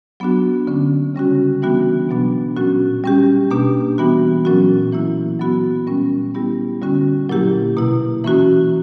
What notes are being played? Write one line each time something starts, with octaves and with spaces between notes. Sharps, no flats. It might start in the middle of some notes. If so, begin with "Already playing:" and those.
F#3 B3 D4 F#4
D3 A#3 C#4
C#3 G3 C#4 F#4
E3 G3 B3 D4 F#4
B2 F#3 B3 D4
A#2 F#3 C#4 F#4
G3 C#4 G4
B2 A#3 D4 G4
E3 G3 B3 F#4
A#2 F#3 C#4 F#4
E3 A#3 E4
F#3 B3 F#4
A#2 G3 C#4
G3 B3 E4 G4
D3 G3 C#4 F#4
A#2 F#3 A#3 E4 G4
B2 A#3 E4
E3 A#3 C#4 F#4